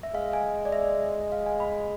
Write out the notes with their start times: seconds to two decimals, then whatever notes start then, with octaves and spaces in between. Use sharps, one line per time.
0.03 E5
0.14 G#3 F5
0.33 G#5
0.65 D5
0.72 E5
1.32 F5
1.46 G#5
1.60 B5